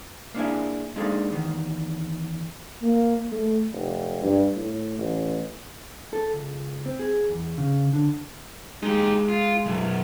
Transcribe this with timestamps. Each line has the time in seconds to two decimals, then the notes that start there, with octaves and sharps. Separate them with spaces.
0.34 A#3 D4 E4 G#4
0.96 G#3 A#3 D4 D#4 G#4 A4
1.30 E2 D#3
2.82 A#3
3.32 A3
3.72 F1
4.23 G2
4.56 A2
4.99 A1
6.13 A4
6.33 C#2
6.86 C4
6.99 G#4
7.29 E2
7.58 C#3
7.93 D3
8.83 G#3 D#4 G4
9.29 F4
9.66 B1 F#2